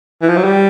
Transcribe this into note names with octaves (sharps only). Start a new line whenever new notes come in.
E3
F3
F#3
G3